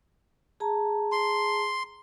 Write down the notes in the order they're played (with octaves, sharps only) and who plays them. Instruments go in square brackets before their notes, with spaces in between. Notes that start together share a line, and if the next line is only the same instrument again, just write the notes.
[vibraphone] G#4 A5 A#5
[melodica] C6